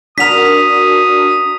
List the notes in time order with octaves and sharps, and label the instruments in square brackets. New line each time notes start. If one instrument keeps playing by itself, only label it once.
[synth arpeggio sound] D4 F#4 A#4 [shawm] D#6 [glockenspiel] B6 F7